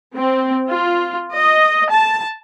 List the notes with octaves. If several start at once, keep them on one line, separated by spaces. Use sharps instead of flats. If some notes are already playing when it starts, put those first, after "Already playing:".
C4
F4
D#5
A5